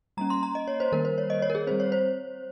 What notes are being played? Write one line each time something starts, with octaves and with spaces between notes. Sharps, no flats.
G3 A#3 C#4 A#5
C6
A#5
D#5
C#5
C5
D#3 G3 A#3 A#4
C5
C#5
D#5
C#5
A#4
G#4
G3 C4 C5
C#5
C5